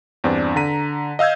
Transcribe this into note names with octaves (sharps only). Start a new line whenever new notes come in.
E2 G2 C4 D4
D3 A#5 B6 D#7
D#5 F5 E6 G6 G#6